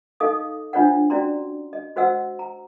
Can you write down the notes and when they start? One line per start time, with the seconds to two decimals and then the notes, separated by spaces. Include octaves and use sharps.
0.20 D#4 A4 D#5 F5 D6 D#6
0.73 D4 F4 C5 C#5 D#5 F#5
1.10 C#4 E4 F#4 D5 A#5 C6
1.73 D#5
1.96 F#4 C5 D#5 F#5 E6
2.39 A#5